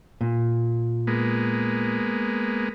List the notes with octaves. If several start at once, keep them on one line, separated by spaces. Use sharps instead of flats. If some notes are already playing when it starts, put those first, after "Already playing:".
A#2
G#3 A#3 B3